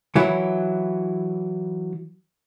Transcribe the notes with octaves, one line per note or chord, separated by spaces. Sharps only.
E3 F#3 E4